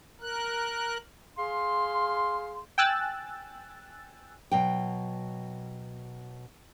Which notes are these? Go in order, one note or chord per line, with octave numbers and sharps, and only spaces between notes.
A#4 F#6
G#4 F5 C6
G5 G#5 E6 F#6 A6
B2 F#3 G5